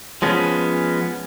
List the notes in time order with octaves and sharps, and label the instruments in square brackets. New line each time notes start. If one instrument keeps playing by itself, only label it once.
[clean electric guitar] F3 G#3 B3 C#4